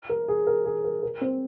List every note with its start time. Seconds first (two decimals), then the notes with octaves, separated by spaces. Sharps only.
0.09 A#4
0.28 G#4
0.47 A#4
0.65 G#4
0.84 A#4
1.03 A#4
1.21 C4 C5